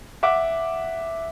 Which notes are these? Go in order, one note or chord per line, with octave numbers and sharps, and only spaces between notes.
E5 F#5 D6